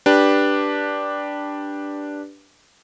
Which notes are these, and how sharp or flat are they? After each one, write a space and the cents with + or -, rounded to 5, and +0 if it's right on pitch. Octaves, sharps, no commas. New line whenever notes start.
D4 +0 G4 +0 B4 -10